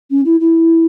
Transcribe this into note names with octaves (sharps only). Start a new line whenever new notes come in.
C#4
E4
E4